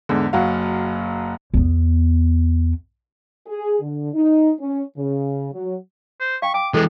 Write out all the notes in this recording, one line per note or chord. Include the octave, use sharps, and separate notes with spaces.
E2 G#2 D3
F#1 F#3 F#4 F5
E2 B3
G#4
D3
D#4
C#4
C#3
F#3
C5
F5 G5 C#6
G5 D6
E3 G#3 D4 A4